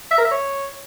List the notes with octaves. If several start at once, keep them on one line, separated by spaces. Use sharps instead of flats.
E5
A#4
E5
C#5